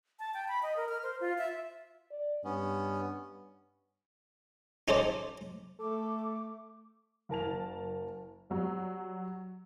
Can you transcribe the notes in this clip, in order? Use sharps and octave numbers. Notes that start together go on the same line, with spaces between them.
A5
G5
B5
D#5
A#4
F6
C5
F4
E5
D5
G2 B3 C#4
C#4 D#4 A4 C5 D5
A3 A4 D6
F#1 A#4 A5 F7
F#3 G3